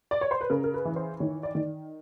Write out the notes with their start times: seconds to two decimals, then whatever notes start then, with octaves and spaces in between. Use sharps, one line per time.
0.11 D5
0.21 C#5
0.31 C5
0.41 B4
0.50 C#3 A#4
0.64 A#4
0.74 B4
0.85 E3
0.96 C5
1.20 D#3 C#5
1.43 D5
1.55 D#3